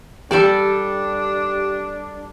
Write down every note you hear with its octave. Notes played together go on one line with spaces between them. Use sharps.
G3 D4 G4 A4 D5 G5